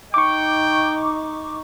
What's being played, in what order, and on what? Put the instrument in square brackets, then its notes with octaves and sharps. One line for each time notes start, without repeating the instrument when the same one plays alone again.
[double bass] D#4 [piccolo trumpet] G5 [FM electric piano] C#6 D6